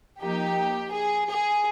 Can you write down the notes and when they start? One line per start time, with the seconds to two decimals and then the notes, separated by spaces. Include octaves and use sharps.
0.20 F3 A#3 D#4 G4
0.91 G#4
1.28 G#4